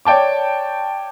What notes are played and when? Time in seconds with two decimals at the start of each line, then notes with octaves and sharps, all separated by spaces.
0.05 C#5 D5 G5 A5 D6